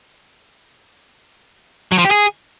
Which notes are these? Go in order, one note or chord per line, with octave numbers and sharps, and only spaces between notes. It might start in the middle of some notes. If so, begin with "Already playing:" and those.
F#3
F3
G4
G#4